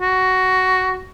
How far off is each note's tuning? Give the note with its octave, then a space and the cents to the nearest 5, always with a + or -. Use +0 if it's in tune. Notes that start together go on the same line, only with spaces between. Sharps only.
F#4 +10